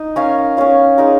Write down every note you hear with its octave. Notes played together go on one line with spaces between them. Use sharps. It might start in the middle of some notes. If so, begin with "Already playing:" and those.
Already playing: D#4
C#4 A#4 C#5 F5
C#4 A#4 C#5 F5
G#3 D#4 A#4